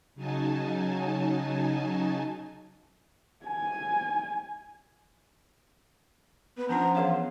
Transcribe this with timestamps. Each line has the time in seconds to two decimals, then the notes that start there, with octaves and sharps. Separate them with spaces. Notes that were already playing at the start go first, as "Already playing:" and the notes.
0.15 C#3 F#3 D#4 G#5 A5
3.45 G#5
6.58 B3 B4
6.69 F3 B3 C#4 D4 F4 A#5
6.95 E3 G#4 C#5 F5